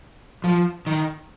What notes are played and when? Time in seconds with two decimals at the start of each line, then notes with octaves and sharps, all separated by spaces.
0.44 F3
0.87 D#3